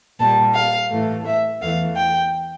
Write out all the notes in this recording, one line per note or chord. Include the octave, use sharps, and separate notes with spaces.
A#2 G3 A5
F5
A2 E3 A3
E5
E2 E3 A3 F5
G5